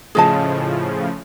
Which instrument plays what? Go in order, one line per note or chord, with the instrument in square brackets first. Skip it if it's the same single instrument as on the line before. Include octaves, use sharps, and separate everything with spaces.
[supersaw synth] A2 C#3 F3 [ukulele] G#4 D#5 A5